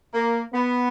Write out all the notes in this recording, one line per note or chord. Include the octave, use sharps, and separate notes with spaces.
A#3
B3